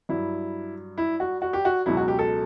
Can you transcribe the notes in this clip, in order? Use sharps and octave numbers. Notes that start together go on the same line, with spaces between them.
G2 F#3 E4
E4
F#4
F#4
G4
F#4
C#2 B2 F#3 E4
F#4
G4
A4